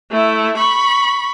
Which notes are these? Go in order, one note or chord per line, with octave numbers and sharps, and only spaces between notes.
A3 E4
B5 C#6